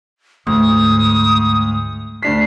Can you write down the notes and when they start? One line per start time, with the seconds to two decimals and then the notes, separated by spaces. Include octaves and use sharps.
0.47 D2 G#2 D#6
2.23 D2 D4 B6 C7